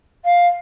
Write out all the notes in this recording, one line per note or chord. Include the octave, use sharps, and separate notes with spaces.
F5